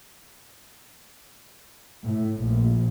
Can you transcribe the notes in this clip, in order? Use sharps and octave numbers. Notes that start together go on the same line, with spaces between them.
A2
A#1